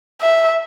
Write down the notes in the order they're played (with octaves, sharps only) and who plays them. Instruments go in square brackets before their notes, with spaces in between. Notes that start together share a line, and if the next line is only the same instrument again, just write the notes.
[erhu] E5